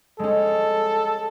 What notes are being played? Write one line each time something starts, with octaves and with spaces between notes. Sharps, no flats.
G#3 C4 C#4 A4